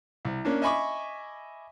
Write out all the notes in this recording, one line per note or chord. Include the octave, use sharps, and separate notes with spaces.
C2
A#3 C#4 D4
D#5 E5 G#5 B5 C#6 D6